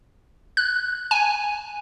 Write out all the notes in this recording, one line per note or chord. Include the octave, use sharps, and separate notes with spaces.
F#6
G#5